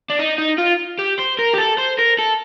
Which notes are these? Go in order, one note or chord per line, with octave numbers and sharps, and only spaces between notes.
D4
D#4
D#4
F4
G4
C5
A#4
G4
A4
C5
A#4
A4